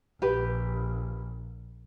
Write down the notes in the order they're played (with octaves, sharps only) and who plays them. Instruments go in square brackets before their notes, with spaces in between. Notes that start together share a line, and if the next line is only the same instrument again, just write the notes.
[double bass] A#1 [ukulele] G4 B4